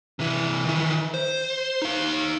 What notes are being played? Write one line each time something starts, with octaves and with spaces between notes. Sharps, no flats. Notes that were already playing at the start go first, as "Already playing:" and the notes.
C3 E3
D#3 E3
C5
D#4 F5